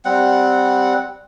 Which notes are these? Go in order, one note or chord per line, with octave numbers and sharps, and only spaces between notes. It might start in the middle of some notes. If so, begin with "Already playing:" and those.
G3 C4 F#5